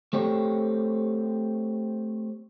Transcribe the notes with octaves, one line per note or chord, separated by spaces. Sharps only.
A3 C4 G4 C#5